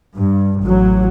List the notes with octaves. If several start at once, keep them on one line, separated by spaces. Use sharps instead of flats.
G2
A1 F#3